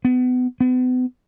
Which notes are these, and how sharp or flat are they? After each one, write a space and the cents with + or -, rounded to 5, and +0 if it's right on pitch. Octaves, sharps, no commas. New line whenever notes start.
B3 +30
B3 +40